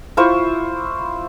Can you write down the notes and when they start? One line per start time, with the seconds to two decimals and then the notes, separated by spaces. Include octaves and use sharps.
0.17 E4 F4 C5 C#6